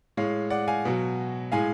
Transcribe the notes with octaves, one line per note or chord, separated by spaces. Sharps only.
A2 G#3 C#5 F5
D5 F#5
F5 G#5
B2 F#3
A2 G#3 F5 G#5